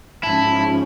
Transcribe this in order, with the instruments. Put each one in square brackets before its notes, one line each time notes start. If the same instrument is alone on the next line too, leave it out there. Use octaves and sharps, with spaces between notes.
[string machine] G#2 F3 C#4 [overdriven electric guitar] E4 [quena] A5